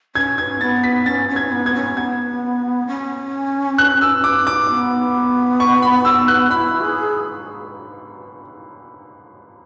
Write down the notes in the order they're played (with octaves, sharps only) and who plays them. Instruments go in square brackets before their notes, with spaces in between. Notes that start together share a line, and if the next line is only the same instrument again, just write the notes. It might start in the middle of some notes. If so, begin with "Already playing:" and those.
[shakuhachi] C#4 [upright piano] G#6
[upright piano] G#6
[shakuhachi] B3 [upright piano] A6
[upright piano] B6
[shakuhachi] C#4 [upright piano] A6
[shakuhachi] C#4
[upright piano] G#6
[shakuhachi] B3
[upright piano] G#6
[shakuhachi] C#4
[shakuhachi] B3 [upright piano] G#6
[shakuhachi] C#4
[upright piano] F#6
E6
D6
D6
[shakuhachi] B3
[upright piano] C#6
B5
E6
F#6
[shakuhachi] E4 [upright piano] B5
[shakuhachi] G#4